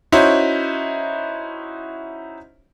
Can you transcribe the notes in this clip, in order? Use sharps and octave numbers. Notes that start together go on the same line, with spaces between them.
C#4 D#4 E4 F#4 C5